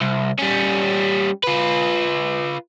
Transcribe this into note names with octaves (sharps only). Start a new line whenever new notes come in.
C2
G3 C#4
F4 B4